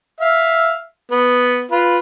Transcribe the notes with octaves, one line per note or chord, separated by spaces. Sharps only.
E5 F5
B3
F4 B4